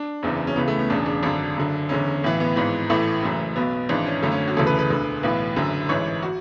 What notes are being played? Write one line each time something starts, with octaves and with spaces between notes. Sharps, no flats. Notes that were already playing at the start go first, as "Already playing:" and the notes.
Already playing: D4
F#1 E2 C#3 E3
C#4
C#2 C#3 E3 B3
A3
B3
E1 E2 C#3 D4
D4
G#1 F#2 D3 D4
F#1 F#2 D3
F#1 E2 D3 C#4
B1 A2 E3
B3
G#1 G#2 E3
A1 A2 E3 A3
F#1 F#2 E3
B1 B2 B3
G#1 G#2 E3 D4
C#4
G#1 F#2 D3 A3
C#4
F#4
E1 D2 C#3 E3 A4
B4
B4
E1 D2 D3
B1 A2 E3 B4
F#1 F#2 D3
A1 G#2 E3 C#5
F#4